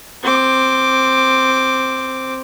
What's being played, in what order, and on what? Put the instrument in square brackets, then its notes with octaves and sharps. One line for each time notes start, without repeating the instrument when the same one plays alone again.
[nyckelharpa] C4 D6